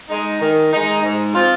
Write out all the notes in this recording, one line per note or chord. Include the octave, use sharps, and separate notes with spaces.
G#3 D#4
D#3
G#3 D#4
G#2
F3 C4 F4